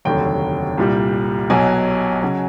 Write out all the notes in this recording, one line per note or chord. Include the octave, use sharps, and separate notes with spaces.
F1 D#2 D3 F#3 G5
C2 A#2 G3
B1 B2 F#3 G#5
C#3 F#3